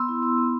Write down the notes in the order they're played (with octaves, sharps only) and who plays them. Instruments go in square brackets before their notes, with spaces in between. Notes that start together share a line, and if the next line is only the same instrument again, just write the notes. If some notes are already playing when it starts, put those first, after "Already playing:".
Already playing: [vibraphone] B3 C6 E6
E4
B3
B3